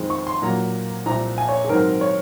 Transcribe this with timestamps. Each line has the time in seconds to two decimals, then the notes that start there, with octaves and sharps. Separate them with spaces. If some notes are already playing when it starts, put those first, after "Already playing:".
Already playing: F2 D#3 G#3 C4
0.10 C#6
0.27 C6
0.42 A#2 F#3 A#3 A#5
1.06 C2 A#2 F3 A#5
1.38 G#5
1.49 C#5
1.64 G#4
1.69 G#2 D#3 F#3 C4 A#4
2.01 C#5